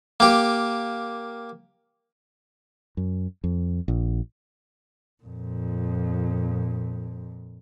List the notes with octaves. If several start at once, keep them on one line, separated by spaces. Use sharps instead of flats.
A#3 G4
F#2
F2
A#1
F2 A#2